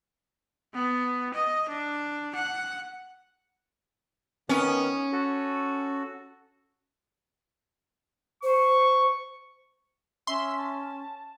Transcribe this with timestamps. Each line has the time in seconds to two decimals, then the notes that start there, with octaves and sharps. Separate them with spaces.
0.74 B3
1.35 D#5
1.69 D4
2.36 F#5
4.49 D#3 B3 C#4
5.13 F#4 A4
8.43 C5 C#6
10.27 C#4 E5 C6
10.57 A5